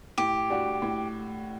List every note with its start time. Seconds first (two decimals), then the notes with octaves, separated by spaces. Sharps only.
0.18 A2 G4
0.50 G3 D4 F#4
0.82 A2